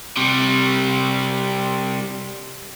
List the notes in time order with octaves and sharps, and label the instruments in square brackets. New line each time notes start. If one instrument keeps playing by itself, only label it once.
[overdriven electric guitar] C3 G3